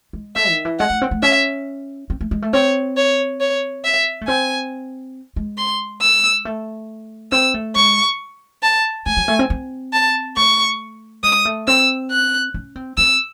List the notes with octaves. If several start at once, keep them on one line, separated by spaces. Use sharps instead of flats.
G#3
A3 E5
D#3
E3
G#3 F#5
A3
C4
A3
C#4 E5
C4
A3
G#3
A3
C4 C#5
C#5
C#5
E5
A3
C4 G#5
G#3
C6
E6
A3
C4 E6
A3
G#3 C#6
A5
A3 G#5
F#3
A3
C4
C4
A5
A3 C#6
G#3 D#6
A3
C4 E6
F#6
C#4
C4
C4 E6